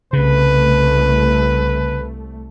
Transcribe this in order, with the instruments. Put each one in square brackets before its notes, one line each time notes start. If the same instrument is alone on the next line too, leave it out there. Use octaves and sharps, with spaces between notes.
[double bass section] C2 A3 [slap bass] C#3 [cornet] B4